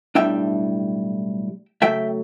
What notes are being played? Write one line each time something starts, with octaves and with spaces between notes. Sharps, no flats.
B1 A2 G3 D4 E5 G5
C#3 F#3 A3 E5 G5